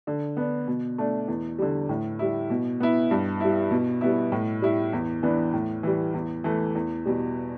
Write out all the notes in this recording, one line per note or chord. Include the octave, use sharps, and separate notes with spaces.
D3
B3 D4
B2
A3 D4
E2
D3 G3
A2
G3 E4
B2
B3 E4
G2
G3 E4
B2
G3 B3 E4
A2
G3 E4
E2
E3 B3 D4
A2
E3 G3
E2
E3 A3
E2
B2 G3